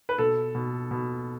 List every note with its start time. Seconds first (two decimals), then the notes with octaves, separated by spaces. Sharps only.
0.09 B4
0.18 B2 A4
0.55 B2
0.91 B2